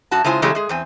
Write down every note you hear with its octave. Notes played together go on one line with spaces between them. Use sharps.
F#2 F#4 A5
C#3 G#3 E4 F4 C5 G#5
C#3 E3 F#3 G#3 A3 G4
G#3 G#4
E2 C4 G#5